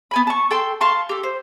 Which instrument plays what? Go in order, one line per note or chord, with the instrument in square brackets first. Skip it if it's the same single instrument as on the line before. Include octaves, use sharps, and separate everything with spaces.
[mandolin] B3 G#5 B5
A5 C#6
A4 G5 C6
F5 A5 C6 C#6
G4 A4
C5